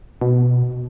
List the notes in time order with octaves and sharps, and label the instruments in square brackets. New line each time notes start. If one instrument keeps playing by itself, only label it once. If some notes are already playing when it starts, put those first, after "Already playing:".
[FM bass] B2